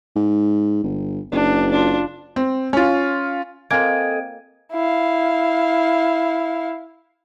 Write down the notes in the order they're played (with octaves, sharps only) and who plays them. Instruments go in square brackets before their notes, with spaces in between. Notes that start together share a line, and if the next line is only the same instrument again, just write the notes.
[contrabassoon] G#2
G1
[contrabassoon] F#1 [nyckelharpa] D4
[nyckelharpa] D4 F4
[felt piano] C4
C#4 F4
[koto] A#3 F4 [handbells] C4 D7 [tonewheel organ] A4 D#5 [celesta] G#5 G#6
[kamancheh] E4 F5